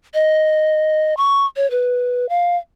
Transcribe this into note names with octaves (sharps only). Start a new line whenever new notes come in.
D#5
C#6
C#5
B4
F5